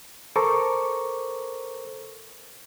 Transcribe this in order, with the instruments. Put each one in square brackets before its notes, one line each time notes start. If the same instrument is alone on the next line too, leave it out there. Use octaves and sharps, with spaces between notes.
[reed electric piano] A4 A#4 C5 A#5 C#6 D6